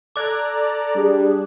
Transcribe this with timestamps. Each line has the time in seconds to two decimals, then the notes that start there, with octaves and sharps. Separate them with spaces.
0.16 A4 D5 A#5 D6 F#6 G#6
0.95 G3 D4 G#4